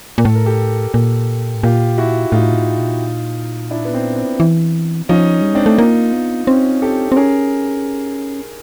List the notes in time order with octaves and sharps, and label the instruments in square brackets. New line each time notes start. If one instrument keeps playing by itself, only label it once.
[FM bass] A#2
[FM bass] A2 [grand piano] A4
[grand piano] A#4
G4 A4
[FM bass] A#2
A2
[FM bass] A#2 [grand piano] F4 G4
[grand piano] E4 F#4
[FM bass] A2 [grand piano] D#4 F4
[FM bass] A#2
A2
A#2
[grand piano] D4 E4
B3
C4
C4
[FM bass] E3
[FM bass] F3 [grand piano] C#4 D#4
[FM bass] G3
[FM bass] G#3 [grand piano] C4 D4
[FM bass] A3
[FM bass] A#3 [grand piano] D#4 F4
[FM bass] B3
[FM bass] C4 [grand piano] C#4 D#4
[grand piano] G4 A4
[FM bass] C4
[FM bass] C#4 [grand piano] G#4 A#4